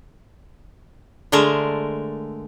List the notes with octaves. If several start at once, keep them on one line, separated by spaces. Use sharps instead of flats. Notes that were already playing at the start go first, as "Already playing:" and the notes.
D3 G#3 A3 A#4 A5